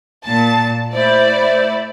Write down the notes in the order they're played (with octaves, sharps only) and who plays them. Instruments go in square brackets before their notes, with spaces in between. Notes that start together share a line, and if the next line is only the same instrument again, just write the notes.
[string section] A#2 A5
[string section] A3 E4 D5 [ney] C5